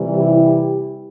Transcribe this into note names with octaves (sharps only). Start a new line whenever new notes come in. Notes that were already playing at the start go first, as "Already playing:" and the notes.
Already playing: C3 E3 G3
E4 G4